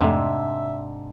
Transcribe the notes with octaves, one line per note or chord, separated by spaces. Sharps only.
F2 G#2 C3 A3 D4 E5